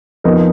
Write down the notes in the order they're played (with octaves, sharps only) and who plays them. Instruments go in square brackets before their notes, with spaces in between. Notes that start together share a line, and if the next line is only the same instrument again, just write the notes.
[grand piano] F2 F3 B3 D#4 A#4